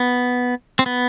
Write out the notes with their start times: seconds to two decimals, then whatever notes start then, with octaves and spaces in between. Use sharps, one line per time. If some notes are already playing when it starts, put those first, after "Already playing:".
Already playing: B3
0.79 C4
0.86 B3